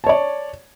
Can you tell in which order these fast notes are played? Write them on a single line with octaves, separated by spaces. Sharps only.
A5 C#5 D5